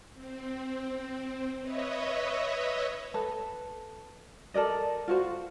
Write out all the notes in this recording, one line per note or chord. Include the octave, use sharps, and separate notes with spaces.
C4
B4 C#5 D#5 E5
A4 B4
A4 A#4 D5 D#5
F4 F#4 C5